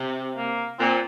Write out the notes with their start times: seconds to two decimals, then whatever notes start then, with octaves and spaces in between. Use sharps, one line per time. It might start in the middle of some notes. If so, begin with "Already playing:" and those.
Already playing: C3
0.37 A#3
0.79 A#2 C4